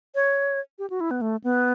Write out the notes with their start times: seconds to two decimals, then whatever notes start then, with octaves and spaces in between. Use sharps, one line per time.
0.15 C#5
0.79 G4
0.90 F#4
1.01 E4
1.11 B3
1.21 A3
1.44 B3